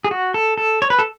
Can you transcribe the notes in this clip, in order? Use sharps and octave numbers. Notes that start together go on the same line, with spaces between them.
G#4
F#4
A4
A4
C#5
B4
A4